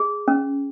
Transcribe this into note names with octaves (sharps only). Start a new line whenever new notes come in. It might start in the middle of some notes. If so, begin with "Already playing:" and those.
Already playing: G#4
C#4